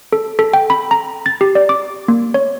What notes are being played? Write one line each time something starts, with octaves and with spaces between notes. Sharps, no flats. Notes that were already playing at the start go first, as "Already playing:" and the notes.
A4
A4
G5
B5
A#5
A6
G4
D5
D6
A#3
C#5